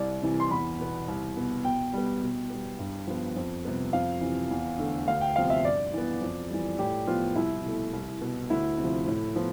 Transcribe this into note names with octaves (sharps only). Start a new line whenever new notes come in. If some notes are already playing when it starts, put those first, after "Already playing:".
Already playing: C2 D5
C3 E3
C6
E2 B5
B2 B3
C2
B2 B3
B2 G5
G3 B3
B2
G3 B3
G2
F3 B3
F2
C3 G3 B3
F2 F5
C3 E3
E2
D3 A3
D2 F5
G5
C3 F3 B3 F5
E5
G2 D5
E3 B3
F2
E3 G3
A2 G4
F3 B3 F4
C2 E4
B2 A3
C2
B2 B3
D2 E4
C3
F3
A2
F3 B3